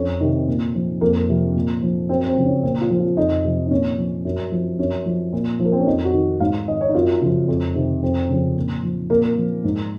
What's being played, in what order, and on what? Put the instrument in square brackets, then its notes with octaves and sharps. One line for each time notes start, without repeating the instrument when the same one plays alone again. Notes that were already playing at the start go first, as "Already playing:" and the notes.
Already playing: [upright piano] F2 C#4
C3 D#3
A#2
F3
F2 A#3
C3 F3
A#2
F3
F#2 C4
C4
C#3 F3
C#4
A#2 C4
F4
F3
F4
F2 D#4
C3 F3
D#4
A#2 C#4
F3
F#2
F3
F#2 C#4
F3
A#2
F3
A#3
C4
C#4
F2 D#4
F#4
D#3
G#2 F5
D#3 D#5
C#5
D#4
F#2 F4
C#3 F3
F2
C3 D#3
F2 C4
C#3 F3
A#2
F3
A#2 A#3
F3
G#2